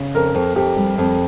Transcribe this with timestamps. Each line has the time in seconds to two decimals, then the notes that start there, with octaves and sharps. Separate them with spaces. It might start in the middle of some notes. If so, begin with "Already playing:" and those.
Already playing: C#3
0.15 F2 A#4
0.35 F2
0.56 F2 G4
0.76 G3
0.98 F2